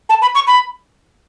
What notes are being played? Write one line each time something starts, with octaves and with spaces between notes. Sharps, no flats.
A5
B5
C#6
B5